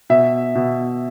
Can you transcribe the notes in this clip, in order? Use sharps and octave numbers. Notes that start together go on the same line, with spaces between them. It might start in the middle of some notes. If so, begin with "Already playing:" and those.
B2 E5
B2